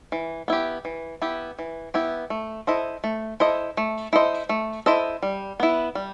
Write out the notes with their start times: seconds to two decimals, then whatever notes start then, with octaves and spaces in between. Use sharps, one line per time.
0.12 E3
0.48 B3 E4 G4
0.85 E3
1.22 B3 E4 G4
1.59 E3
1.94 B3 E4 G4
2.30 A3
2.67 E4 A4 C5 D#5
3.04 A3
3.40 E4 A4 C5 D#5
3.77 A3
4.13 E4 A4 C5 D#5
4.49 A3
4.86 E4 A4 C5 D#5
5.23 G3
5.60 B3 E4
5.95 G3